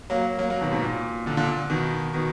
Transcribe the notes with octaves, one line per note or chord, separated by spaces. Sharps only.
F#3 A#3
F#3 A#3
F#3 A#3
B2 D#3
G#2 B2
A#2
A#2 D3
A#2 D3
A#2
B2 D#3
B2 D#3